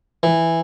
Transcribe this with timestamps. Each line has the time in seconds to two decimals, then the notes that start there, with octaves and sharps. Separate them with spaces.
0.23 E3